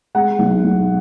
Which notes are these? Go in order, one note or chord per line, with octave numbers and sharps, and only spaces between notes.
G#3 F#5
B1
B1